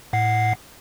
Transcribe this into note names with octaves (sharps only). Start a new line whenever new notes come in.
A2 F#5 C7